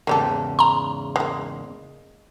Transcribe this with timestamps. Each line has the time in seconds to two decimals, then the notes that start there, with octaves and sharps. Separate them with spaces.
0.07 E2 G#2 C#3 A#3 G4 A4
0.59 A#5 C6
1.16 G#3 A#3